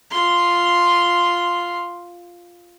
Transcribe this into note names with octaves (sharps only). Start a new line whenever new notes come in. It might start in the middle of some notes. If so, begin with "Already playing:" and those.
F4 C6